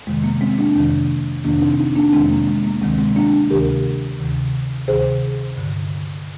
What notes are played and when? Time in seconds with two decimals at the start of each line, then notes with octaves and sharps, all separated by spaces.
0.07 F2 C3 D#3 G#3
0.24 A#3
0.41 G#3 C4
0.58 A#3 D4
0.75 F2 C3 D#3
1.44 F2 C3 D#3 A#3 D4
1.61 C4 D#4
1.79 C4 D#4
1.95 A#3 D4
2.13 F2 C3 D#3 G#3 C4
2.30 A#3
2.47 G#3
2.64 A#3
2.81 D2 C3 D#3 G#3 C4
2.98 G#3 C4
3.16 A#3 D4
3.50 D2 C3 D#3 G4 A#4
4.19 D2 C3 D#3
4.88 D2 C3 D#3 G#4 C5
5.57 G2 D3